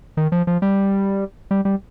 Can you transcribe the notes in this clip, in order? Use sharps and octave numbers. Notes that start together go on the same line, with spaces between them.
D#3
F3
F3
G3
G3
G3